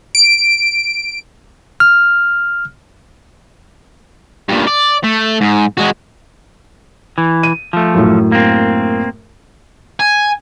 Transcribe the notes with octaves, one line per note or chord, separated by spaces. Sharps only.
D7
F6
G2 A#2
D5
A3
G#2
G#3 F#4
E3
D#7
F3 A3
F#2 A2
A#3 C4
G#5